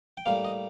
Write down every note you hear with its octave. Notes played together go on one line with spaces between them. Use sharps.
G5
A2 G3 A#3 F5
D#5